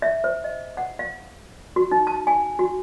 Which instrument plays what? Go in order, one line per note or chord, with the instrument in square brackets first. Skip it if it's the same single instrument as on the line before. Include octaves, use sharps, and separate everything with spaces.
[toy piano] E5
C5
D#5
F#5
F5
F#4
D#4
A5
G#5
F#4